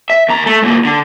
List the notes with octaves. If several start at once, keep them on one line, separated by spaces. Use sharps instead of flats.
E5
D#2 A#5
A3
D2 A#2
D3